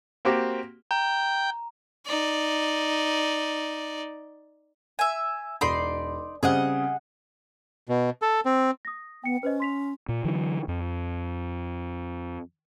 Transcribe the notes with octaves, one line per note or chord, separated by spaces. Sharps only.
A#3 C4 F#4 G4
G5 A#5
D#4 D5
E5 G#5
E1 D#4 D5 B5 C6
C#3 G3 C4 G#4 D#5 F#5
B2
A4
C4
D#6 A#6
B3 G5 C#7
C#4 B4 C5 D#5
C6 B6 F7
A#2
D3 E3 F#3
F2